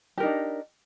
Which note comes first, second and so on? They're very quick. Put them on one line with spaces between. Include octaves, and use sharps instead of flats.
G4 A#4 D#4 D4